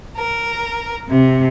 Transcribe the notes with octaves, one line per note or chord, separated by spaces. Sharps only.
A#4
C3